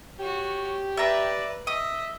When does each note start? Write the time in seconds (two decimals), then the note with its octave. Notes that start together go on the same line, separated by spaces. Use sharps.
0.19 F#4 G4 C#5
0.97 B4 D5 E5 A#5
1.67 D#5 E5 D#6